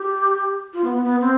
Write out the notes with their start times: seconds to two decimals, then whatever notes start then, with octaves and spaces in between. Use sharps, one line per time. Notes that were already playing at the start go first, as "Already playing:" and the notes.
Already playing: G4
0.73 F4
0.84 B3
0.94 B3
1.05 B3
1.21 C4